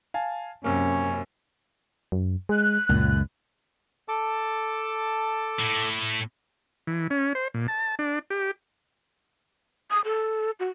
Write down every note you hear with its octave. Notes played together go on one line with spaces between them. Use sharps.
F5 G#5 A5
F#2 C3 A#3 C#4
F#2
G#3 F#6
C#2 F#2 A#2
A4 A5 D6
A2
E3
C#4
C5
A#2
A5
D4
G4
D#6
A4
F#4